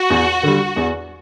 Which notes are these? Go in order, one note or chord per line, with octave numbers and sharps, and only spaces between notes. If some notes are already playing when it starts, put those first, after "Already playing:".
Already playing: F#4
E2
D3 G3
E2